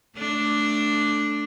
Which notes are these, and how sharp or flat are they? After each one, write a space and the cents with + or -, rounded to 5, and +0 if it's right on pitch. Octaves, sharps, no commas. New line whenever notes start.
A3 +0 D4 +0